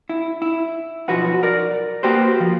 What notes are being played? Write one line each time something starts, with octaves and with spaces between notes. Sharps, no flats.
E4
E4
B1 F3 F#4 B4 F#5
A#4 D5
A#3 F#4 G4 B4 C5
F3